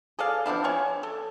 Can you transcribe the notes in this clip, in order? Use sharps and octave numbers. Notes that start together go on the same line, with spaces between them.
G#4 A4 D5 F5
F3 B3 D4 E4
C#5 G#5 C#6
A4